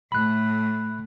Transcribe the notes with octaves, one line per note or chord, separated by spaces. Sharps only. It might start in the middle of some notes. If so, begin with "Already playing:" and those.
A2 A3 B5 F#6